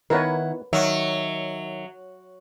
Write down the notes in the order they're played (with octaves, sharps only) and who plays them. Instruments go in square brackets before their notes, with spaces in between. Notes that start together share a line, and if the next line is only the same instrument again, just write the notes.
[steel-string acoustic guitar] D#3 E4 F#5 [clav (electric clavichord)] B3 D#4 [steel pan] A#4 B4 C#5
[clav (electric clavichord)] D#3 [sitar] F#3 [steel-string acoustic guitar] E5